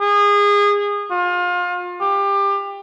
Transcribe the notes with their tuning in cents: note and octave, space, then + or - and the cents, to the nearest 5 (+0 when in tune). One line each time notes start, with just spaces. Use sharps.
G#4 -25
F4 +30
G4 +25